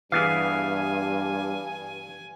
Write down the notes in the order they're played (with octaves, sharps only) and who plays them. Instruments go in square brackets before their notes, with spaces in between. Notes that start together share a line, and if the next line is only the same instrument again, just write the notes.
[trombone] G2 [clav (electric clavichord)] E3 B3 G#4 [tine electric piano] F5 [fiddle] G#5